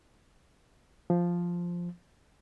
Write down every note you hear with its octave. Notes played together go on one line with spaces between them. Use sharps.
F3